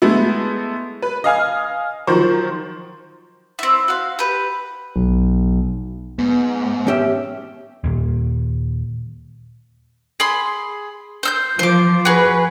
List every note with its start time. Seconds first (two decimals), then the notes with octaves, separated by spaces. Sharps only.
0.02 G#3 A3 B3 E4
1.02 B4
1.24 D#5 F5 G#5 F6
2.07 D#3 F3 F#3 C5 C#6
3.59 C4 E4
3.88 F#4 F5
4.19 G4 B4
4.96 B1
6.19 G#2 B3
6.87 C#4 G4 E5
7.84 D#2 A#2
10.20 G#4 B5 C6
11.23 C5 E6 G6
11.59 F3 C5 D6
12.05 F#4 G#4 B4